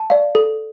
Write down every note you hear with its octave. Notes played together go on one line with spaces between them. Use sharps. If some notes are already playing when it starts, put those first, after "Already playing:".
Already playing: A5
D5 F5
A4